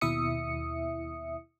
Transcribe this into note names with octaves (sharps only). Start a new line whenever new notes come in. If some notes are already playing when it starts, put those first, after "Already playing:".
D#2 B2 E4 E5 D#6 C#7